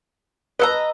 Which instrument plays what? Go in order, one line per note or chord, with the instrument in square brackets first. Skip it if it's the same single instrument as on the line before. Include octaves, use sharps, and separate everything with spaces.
[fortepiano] B4 E6 [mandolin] D#5 F#5 A#5